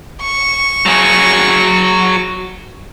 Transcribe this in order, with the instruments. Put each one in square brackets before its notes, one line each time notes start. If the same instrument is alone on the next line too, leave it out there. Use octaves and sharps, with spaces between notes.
[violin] C#6
[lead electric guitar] F#3 G#4